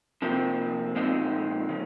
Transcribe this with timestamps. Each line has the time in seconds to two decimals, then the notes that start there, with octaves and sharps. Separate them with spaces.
0.22 C3 F3 A#3 C4
0.95 A#2 F3 G#3 C4 D#4
1.69 C#3 F3